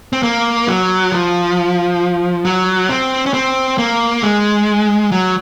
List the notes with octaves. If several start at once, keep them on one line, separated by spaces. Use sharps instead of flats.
C4
A#3
F#3
F3
F#3
C4
C#4
C4
A#3
G#3
F#3